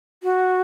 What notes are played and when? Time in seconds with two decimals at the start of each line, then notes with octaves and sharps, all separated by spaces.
0.23 F#4